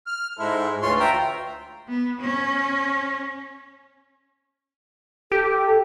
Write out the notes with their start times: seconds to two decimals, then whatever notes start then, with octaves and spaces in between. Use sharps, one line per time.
0.07 F6
0.39 G#2 G#3 E4 A4 C5
0.82 D2 E3 F4 C#5 C6
0.99 E5 G5 A#5
1.88 B3
2.21 C#4
5.32 G4 A4